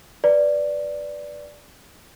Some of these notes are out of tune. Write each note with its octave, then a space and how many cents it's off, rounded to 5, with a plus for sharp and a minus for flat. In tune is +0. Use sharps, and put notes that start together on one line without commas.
B4 +0 D5 +0